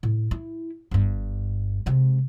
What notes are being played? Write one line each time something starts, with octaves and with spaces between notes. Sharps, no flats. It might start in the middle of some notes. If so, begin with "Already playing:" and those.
A2
E4
G1 G2
C3 G#3